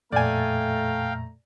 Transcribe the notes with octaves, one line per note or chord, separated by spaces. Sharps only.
F2 A#2 A3 D5 F5 G5 G#5 A#5